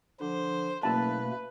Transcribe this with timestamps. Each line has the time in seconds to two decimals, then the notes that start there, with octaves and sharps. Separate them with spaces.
0.20 D3 F3 C5
0.83 F#1 B2 A3 A#3 B4 A5 B5